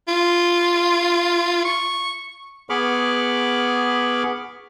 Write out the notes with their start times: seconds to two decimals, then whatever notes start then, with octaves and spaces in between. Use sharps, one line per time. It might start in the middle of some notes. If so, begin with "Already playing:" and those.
0.08 F4
1.65 C#6
2.70 B3 G#4 B5 C#6 D6 F6